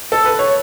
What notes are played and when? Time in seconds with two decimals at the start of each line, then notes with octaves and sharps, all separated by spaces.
0.12 A4
0.25 B4
0.39 C#5